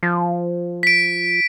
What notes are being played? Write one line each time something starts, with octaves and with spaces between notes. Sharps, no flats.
F3
B6 D7